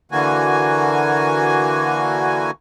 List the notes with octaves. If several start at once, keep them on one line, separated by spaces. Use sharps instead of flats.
D3 E3 A#3 F#4 G#5